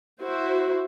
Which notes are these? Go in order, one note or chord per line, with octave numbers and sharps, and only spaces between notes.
E4 F#4 C5